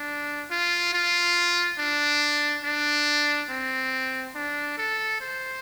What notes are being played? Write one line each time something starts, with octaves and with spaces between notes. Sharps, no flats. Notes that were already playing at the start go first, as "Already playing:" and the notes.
Already playing: D4
F4
F4
D4
D4
C4
D4
A4
C5